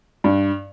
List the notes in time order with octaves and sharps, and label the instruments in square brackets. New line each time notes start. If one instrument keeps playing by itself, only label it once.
[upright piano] G2